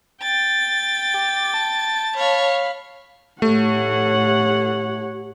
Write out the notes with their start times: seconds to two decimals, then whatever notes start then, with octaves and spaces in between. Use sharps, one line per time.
0.22 G5 A6
1.14 G4
1.54 A5
2.16 C#5 F5 B5
3.42 A2 A3 G4 C#5 F#5